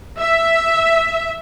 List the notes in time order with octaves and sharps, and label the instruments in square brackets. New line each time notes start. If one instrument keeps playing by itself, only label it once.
[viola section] E5